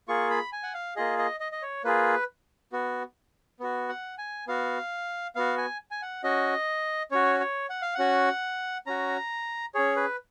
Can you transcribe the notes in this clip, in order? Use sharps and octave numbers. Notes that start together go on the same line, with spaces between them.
A#3 F4 G#4 C#6
B5
G#5
F#5
F5
A#3 F4 G#4 D#5
D#5
D#5
D#5
C#5
A#3 F4 G#4 B4
B3 F#4
B3 F#4
F#5
G#5
B3 F#4 F5
B3 F#4 F5
G#5
G#5
F#5
C#4 F#4 D#5
C#4 F#4 C#5
C#5
F#5
F5
C#4 F#4 F#5
C#4 F#4 A#5
C#4 G#4 C#5
B4